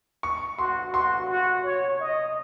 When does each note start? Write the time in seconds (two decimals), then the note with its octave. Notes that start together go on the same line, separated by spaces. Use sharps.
0.23 C#6
0.59 F#4 C6
0.93 F#4 C6
1.29 F#4
1.64 C#5
2.00 D#5